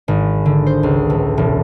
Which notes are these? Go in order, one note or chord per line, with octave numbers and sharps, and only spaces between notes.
G#1
D3
C5
C#2
A1
E1